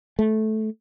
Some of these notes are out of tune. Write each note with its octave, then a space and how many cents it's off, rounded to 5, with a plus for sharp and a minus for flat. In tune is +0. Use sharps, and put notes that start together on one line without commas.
A3 -15